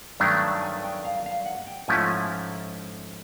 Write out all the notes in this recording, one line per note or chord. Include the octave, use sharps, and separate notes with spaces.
G2 D#3 F#3 A3 D4
A5
G#5
G5
F5
F5
F#5
G5
G#2 F3 A3 C#4 E4 G#5